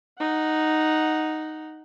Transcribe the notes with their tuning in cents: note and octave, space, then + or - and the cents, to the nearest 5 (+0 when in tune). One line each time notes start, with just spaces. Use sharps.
D#4 +0 F#5 +0